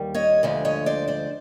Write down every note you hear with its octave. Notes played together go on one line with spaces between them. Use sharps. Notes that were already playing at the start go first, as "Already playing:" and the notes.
Already playing: D#2 D#3 G3
C#5 D#5
D2 D3 F3 G#3 D5 E5
C#5 D#5
C5 D5
C5 D5